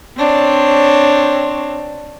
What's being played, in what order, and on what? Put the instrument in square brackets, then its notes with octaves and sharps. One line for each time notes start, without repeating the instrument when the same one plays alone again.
[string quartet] C4 D4 C#5